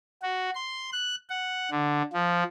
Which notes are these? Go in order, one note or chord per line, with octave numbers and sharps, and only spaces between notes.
F#4
C6
F#6
F#5
D3
F3